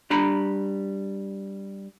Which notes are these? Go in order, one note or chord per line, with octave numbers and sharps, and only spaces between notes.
G3 D4 A#5 B5